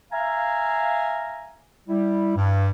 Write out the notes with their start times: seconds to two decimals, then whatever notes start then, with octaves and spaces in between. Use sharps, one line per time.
0.12 E5 F5 G#5 A#5
1.89 G3 E4
2.36 G2